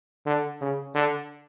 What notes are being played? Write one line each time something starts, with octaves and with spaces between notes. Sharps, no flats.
D3
C#3
D3